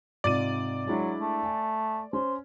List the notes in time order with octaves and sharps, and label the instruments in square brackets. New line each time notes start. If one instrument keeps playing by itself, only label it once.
[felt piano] G#2 C3 F4 [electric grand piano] D5 A6 D#7
[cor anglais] F#3 [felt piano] G#3 D4 E4
[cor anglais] A3
[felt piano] G#5
[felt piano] C#4 [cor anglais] C5